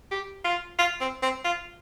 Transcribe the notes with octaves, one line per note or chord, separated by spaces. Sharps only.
G4
F4
F4
C4
C4
F4